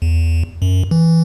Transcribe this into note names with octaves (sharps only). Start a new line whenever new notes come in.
E2
F#2
E3